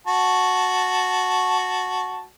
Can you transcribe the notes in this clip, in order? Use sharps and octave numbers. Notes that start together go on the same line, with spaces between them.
F#4 A5